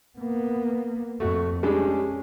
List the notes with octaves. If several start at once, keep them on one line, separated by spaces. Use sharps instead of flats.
A#3 B3
F2 A3 F#4
G3 G#3 C#4 D4